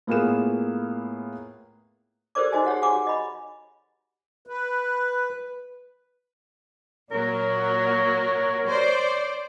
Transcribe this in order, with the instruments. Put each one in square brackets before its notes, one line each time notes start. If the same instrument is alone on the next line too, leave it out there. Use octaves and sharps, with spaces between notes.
[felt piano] A2 A#3 B3 F4 G#4 E7
[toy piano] G4 A4 A#4 C5 D5 D6
D#4 F#4 C5 D#5 G#5
G4 G#4 C#5 F#5
F#4 G#4 F#5 G#5 C#6 D6
D#5 B5
[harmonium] B4
[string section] A#2 F#3 [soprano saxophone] A#4 [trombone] C#5
[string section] C5 D5